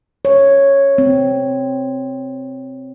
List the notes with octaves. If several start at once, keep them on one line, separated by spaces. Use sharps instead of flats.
C#5
C4